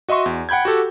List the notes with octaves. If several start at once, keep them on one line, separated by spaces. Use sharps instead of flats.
F#4 D#5 E5 C6 C#6
E2
F#5 G5 B5 G6 G#6
F#4 G4 A4